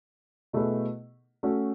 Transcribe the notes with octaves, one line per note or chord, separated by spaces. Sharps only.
B2 A3 E4 G#4 B4
A3 C#4 F#4